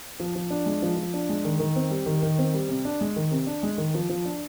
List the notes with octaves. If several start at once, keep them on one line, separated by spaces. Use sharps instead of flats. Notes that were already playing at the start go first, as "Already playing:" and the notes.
F3
F3
D4
G#3
F3
F3
D4
G#3
D#3
D#3
C4
G3
D#3
D#3
C4
G3
C3
D4
G#3
D#3
C3
D4
G#3
D#3
F3
F3
D4